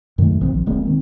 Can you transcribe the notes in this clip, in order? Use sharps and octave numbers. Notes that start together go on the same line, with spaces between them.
F#2 D#3 G#3 A3
A#1 D#3 F3 C4
A#1
D1 G#3 A#3 C4
D#3 C4